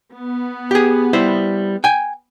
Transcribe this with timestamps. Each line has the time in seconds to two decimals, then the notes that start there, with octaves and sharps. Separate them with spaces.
0.14 B3
0.71 G4 G#4
1.13 G3 E4 C5
1.84 G5 G#5